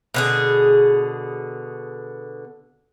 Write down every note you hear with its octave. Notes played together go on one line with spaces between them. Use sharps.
B2 D3 G#4